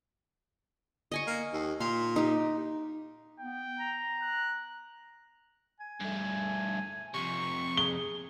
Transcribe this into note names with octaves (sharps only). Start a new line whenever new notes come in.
D#5 G#5 C#6
A#3
D#2
A#2 C6
D#4 G4
B3 G5
A#5
F#6
G#5
G2 A3
F2 C3 C#6
G#4 G7